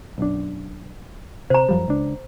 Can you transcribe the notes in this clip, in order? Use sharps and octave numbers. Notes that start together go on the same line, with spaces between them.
B1 F#2 D4
C3 C5 A#5
F#2 F3 G3
C#2 D4